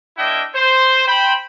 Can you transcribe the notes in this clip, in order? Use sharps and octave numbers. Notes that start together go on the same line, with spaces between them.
A#3 D4 E4 D#5 E5 G5
C5
C5 G5 B5